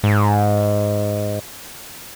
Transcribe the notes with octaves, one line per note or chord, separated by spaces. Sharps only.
G#2